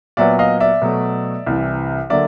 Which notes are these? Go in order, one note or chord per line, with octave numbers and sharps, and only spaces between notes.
A#2 F#3 B3 D5 E5
D#5 F5
D5 E5
B2 F#3 A3
C2 C3 E3
D3 F#3 A#3 D5 E5